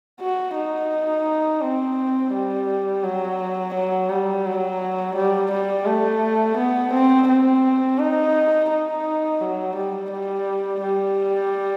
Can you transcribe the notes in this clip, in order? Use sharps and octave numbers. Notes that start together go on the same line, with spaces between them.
F#4
D#4
C4
G3
F#3
F#3
G3
F#3
G3
G3
A3
B3
C4
C4
D#4
D#4
F#3
G3
G3
G3